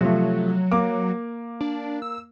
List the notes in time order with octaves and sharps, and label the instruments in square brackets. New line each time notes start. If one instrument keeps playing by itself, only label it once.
[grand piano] C3 F3 A3 [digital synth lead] F#3
[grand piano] A#3 D6
[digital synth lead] D4
E6